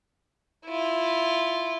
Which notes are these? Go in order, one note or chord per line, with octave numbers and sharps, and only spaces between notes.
E4 F4